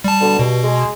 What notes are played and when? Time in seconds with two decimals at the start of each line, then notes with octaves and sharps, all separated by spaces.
0.04 G3 A5
0.21 B2 D3
0.39 G2 B2
0.64 G#3